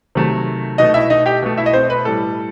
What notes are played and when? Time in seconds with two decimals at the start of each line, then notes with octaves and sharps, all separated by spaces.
0.15 C3 D#3 F#3 A3
0.78 B2 A3 D#4 D#5
0.94 E4 E5
1.10 D#4 D#5
1.26 G4 G5
1.43 B2 A3
1.58 E4 E5
1.66 D#5
1.73 C4 C5
1.90 B4
2.05 A2 G3 A4